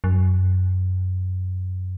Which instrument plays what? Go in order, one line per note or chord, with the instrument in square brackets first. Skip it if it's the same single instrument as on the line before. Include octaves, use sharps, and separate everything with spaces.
[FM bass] F#2